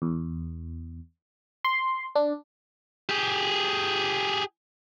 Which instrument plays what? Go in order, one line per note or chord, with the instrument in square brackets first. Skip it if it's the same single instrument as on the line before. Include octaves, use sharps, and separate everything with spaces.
[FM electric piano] E2
C6
D4
[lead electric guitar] G4 G#4